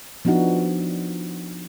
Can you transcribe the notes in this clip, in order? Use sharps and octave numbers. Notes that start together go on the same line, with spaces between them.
F3 B3 D4 D#4 F#4